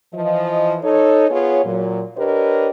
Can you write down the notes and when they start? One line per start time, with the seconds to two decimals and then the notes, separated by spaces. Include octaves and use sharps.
0.14 E3 F3 D#5
0.83 D#4 A4 C#5
1.30 B3 F4 G#4 C#5
1.64 A#2 F#3
2.16 D4 G4 A#4 B4 C#5 D#5